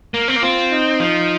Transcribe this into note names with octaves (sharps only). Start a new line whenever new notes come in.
A#3
C4
A#3
C4 F4
D#4
F3